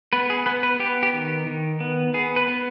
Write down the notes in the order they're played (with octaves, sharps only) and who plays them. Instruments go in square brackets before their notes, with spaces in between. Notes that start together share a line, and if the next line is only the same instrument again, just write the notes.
[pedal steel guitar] B3 B4
G#4
B3 B4
B4
B3 G4
G4
D#3
D#3
B3
B3 G#4
B4
B3